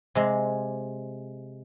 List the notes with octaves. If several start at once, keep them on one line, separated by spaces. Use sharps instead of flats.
C3 G#3